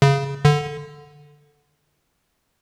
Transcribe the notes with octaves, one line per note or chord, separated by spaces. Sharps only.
C#3
D3